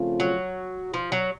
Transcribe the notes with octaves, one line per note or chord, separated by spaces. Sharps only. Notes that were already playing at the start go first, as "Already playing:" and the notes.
Already playing: C#3 F3 A3 C4 F4
F#3
F3
F#3